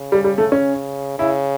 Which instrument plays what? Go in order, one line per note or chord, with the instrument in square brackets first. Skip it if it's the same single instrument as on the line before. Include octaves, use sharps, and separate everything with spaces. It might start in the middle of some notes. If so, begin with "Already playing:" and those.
Already playing: [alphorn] C#3
[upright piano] G3
G3
A3
C#4
[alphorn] C#3 [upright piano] E4